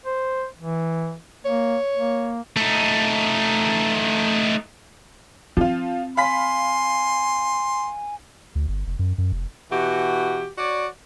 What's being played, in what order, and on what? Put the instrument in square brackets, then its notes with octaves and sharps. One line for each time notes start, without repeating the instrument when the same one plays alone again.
[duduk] C5
E3
[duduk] A#3 [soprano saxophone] C#5
[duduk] A#3
[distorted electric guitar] A3 D#4
[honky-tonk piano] F3 F4 [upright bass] C4
[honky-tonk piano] F5 B5 B6 [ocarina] G#5 [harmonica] C6
[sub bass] D2
G1
F1
F#2
F#2
F1
[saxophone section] B2 E3 F#4 G4
F#4 C#5 D5